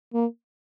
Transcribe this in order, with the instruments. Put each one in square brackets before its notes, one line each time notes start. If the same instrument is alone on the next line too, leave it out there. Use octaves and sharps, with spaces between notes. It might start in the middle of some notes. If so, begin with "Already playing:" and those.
[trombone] A#3